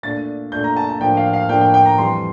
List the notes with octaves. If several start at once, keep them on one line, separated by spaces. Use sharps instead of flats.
A#2 A3 D4 A6
A#2 A3 D4 G6
A#5
A5
A5
A2 F3 A#3 D4 G5
F5
F5
A2 F3 A#3 D4 G5
G5
G5
A#5
F2 E3 G3 C6